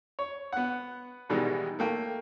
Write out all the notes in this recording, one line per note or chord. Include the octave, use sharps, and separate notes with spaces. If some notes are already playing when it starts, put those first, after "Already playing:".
C#5
B3 F#5
G#2 B2 D#3 E3 G3 G#3
A3 A#3 G5